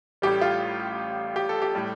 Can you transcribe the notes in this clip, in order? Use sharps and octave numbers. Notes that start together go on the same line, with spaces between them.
A1 A2 G3 G4
F4
G4
A4
G4
A2 G3